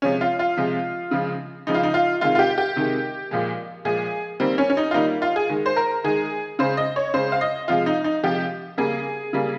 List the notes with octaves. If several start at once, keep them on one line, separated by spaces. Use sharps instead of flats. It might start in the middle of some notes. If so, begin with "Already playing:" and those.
C3 F3 G#3 C#4
F4
F4
C3 F3 G#3
C#3 F3 G#3
C#3 F3 G#3 D#4
F4
D#4
F4
C3 D#3 G#3 F4
F4
G4
G4
C3 D#3 G#3
A#2 F3 G#3
A#2 F3 G#3 G#4
D#3 G3 A#3 C4
C#4
C#4
D#4
F4
D#3 G3 A#3 D#4
F4
G#4
D#3 G#3
C5
A#4
D#3 G#3 G#4
C#3 G#3 C5
D#5
C#5
C#3 G#3 C5
F5
D#5
C3 F3 G#3 F4
D#4
D#4
C3 F3 G#3 G4
C#3 G3 A#3 G#4
C#3 G3 A#3